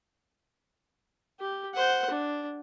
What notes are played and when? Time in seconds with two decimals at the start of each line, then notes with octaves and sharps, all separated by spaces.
1.40 G4
1.74 C5 F#5
2.10 D4